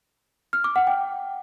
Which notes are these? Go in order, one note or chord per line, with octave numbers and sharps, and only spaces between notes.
F6
D6
F#5
G5